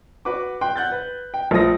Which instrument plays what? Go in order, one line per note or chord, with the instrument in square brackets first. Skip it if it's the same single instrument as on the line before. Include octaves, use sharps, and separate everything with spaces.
[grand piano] F#4 B4 F#5 D6
G5 C6 F#6
F#5 F#6 G6 A6
B4
G5
A#1 A3 F4 D#6 A#6